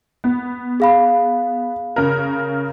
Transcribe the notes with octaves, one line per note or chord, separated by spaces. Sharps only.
B3
G#4 F5 B5
C#3 A#4